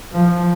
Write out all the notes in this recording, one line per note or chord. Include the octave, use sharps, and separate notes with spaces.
F3